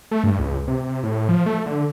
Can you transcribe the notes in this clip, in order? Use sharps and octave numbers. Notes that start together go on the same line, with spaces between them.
A3
G2
C#2
C3
C3
A2
F3
A3
D3